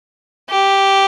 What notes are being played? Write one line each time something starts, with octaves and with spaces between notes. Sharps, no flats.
G4